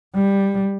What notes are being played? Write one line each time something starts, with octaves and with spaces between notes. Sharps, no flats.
G3